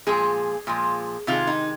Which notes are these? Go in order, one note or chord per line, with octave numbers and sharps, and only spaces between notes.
A#2 F3 G#3 G#4
A#2 F3 G#3
C3 D#3 G#3 F4
D#4